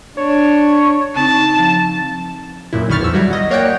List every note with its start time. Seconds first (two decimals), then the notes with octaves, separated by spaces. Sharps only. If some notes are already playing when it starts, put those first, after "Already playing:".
0.17 D4 C#5
1.16 C#3 C4 D#4 A5
1.59 F3
2.73 F#2 A#2 E4
2.89 B1 D#3 B5 C#6 F6 A6
3.00 E2 F3 E6
3.13 F#3 G3 E4 F#4
3.30 F#4 D#5
3.50 A#3 C#5 D5 F#5 G5